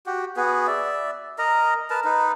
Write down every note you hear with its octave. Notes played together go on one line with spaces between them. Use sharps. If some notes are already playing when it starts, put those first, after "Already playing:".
F#4 G4
B3 F#4 G#4 B4
D5 E5
A#4 D#5 A#5
A#4 B4 A5
D#4 B4